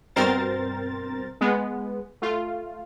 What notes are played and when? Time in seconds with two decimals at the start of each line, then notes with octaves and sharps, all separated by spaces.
0.16 G2 B2 C4 A#4 C5 A6
1.41 G#3 B3
2.22 A3 F4